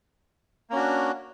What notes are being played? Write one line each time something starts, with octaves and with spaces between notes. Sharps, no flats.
A#3 C#4 D4 F#4